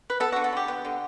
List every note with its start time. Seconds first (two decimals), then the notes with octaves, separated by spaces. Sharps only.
0.10 B4
0.20 B3 A4
0.32 D3 F#4
0.44 A4
0.53 D3 G4
0.68 B3
0.85 D3